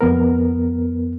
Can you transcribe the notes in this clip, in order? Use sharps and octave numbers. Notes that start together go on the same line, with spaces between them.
F2 B3 A#4